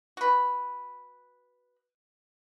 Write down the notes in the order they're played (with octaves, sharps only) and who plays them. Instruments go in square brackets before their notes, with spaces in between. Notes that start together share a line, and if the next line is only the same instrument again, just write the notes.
[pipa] F#4 B4